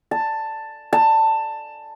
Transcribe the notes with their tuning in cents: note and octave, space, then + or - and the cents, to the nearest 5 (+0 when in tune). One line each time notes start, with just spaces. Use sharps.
A5 +10
A5 +15